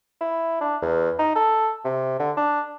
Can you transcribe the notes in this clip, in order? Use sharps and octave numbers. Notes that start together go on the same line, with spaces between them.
E4
D4
E2
D#4
A4
C3
D3
D4